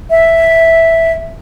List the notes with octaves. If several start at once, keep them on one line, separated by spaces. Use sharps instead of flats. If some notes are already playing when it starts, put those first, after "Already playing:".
E5